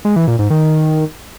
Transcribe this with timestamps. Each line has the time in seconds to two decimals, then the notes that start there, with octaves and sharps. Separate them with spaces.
0.05 G#3
0.16 E3
0.28 A#2
0.39 G#2
0.50 D#3